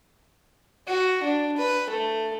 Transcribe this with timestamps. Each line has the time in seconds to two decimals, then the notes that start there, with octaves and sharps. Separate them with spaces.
0.88 F#4
1.23 D4
1.57 B4
1.90 A3